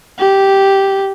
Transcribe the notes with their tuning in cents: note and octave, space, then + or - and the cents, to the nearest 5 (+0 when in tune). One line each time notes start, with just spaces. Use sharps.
G4 -5